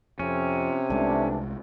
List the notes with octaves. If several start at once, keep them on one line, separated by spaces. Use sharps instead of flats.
F2 C3 C#4
C2 E3 G#3 A3 D4